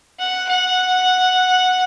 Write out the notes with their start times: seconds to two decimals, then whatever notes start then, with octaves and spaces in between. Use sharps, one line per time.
0.20 F#5
0.49 F#5